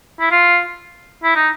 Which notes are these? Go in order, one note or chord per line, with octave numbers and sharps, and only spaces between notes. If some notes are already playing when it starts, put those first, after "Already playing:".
E4
F4
E4
D#4